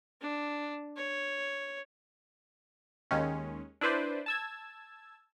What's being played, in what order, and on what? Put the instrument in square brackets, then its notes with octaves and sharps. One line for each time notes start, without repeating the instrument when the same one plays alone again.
[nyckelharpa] D4
C#5
[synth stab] D#2 D#3 G#3 C#4
D4 E4 B4 C5 D5
A5 E6 G#6